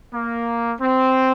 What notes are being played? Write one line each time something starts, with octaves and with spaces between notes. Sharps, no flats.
A#3
C4